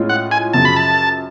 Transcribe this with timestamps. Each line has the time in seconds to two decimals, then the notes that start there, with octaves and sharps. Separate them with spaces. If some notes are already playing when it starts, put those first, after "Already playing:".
Already playing: A2 G#3 C#4 F4
0.09 F#5
0.31 G#5
0.53 F#2 C#3 F3 A5
0.65 B5
0.76 A5